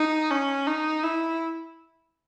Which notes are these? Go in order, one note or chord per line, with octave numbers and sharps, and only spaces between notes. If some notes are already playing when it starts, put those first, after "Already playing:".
Already playing: D#4
C#4
D#4
E4